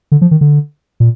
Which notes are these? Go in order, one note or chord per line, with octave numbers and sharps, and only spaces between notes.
D3
F3
D#3
D3
A#2